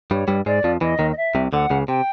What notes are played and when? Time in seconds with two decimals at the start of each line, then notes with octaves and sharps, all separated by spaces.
0.11 G2 G3 C#5
0.28 G2 G3
0.46 G#2 G#3 D5
0.64 F2 F3
0.81 E2 E3 D#5
0.99 D#2 D#3
1.12 D#5
1.17 E5
1.35 C2 C3
1.53 D2 D3 F#5
1.70 C#2 C#3
1.88 C3 G5